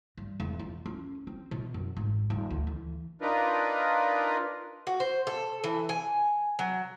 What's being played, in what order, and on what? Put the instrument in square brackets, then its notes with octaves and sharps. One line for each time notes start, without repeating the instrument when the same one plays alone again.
[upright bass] G2
E1
F4
C#4
C4
B2
F#2
G#1
D#1
D2
E3
[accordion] D4 D#4 F4 A#4 B4
[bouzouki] F#4
C5
A4
E3
G#5
F#3